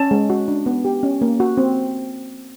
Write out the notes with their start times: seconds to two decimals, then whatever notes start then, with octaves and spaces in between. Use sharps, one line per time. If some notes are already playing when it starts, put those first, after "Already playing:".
Already playing: C#4 A5
0.11 G#3
0.30 F#4
0.48 D4
0.66 B3
0.85 G4
1.03 C#4
1.21 A#3
1.40 F#4
1.57 C4